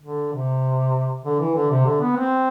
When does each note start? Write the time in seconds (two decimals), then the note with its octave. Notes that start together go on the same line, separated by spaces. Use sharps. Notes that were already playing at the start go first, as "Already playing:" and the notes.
0.02 D3
0.33 C3
1.24 D3
1.40 E3
1.55 D3
1.70 C3
1.85 D3
2.01 B3
2.16 C4